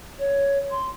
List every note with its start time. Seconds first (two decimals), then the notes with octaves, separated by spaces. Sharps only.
0.19 C#5
0.70 C6